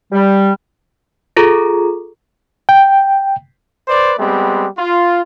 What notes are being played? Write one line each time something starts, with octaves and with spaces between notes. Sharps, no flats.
G3
F4 G#4 A4 A#5
G5
B4 C5 D5
G3 G#3 B3 C4
F4